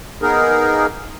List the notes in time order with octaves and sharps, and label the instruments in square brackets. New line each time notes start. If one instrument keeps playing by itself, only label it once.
[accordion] A#3 B3 D#4 G#4 A#4